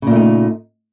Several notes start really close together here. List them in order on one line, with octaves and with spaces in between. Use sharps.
C#3 A#2 A3 D#4